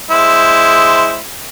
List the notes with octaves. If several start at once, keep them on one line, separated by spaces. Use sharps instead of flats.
G#3 E4 C5